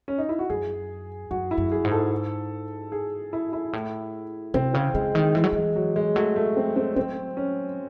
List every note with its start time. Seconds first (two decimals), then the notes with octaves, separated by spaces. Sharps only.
0.08 C#4
0.18 D#4
0.29 E4
0.39 F#4
0.50 F#2 G#4
1.31 F#2 F#4
1.51 E4
1.58 F#2
1.72 G#4
1.85 G#2
1.91 A4
2.92 G#4
3.33 E4
3.53 E4
3.73 A2
4.54 C3 C4
4.74 C#3 C4
4.94 C#3 G#3
5.14 D#3 G#3
5.35 E3 G#3
5.44 F#3
5.52 E3 G#3
5.76 F#3
5.96 G#3
6.15 F#3 A3
6.36 A3
6.57 C4
6.76 C4
6.96 F#3 C4
7.37 C#4